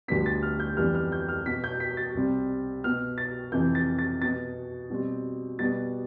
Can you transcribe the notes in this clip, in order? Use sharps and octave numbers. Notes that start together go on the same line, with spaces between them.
D2 D3 G3 B3 B6
A6
F6
G6
F2 E3 G3 B3 F6
F6
G6
F6
B2 B3 B6
G6
B6
A6
C2 C3 G3 C4
B2 B3 F6
A6
F2 C3 E3 G6
A6
A6
B2 B3 A6
B2 G3 C4
B2 G3 B3 A6